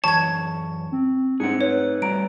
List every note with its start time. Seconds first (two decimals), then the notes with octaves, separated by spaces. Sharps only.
0.04 F#2 E3 C#5 A5 C#6 G#6
0.92 C4
1.40 G#2 C4 G#4 F#5 C#7
1.61 A3 D#4 B4 C#5
2.02 G3 A3 F#4 A#5 D7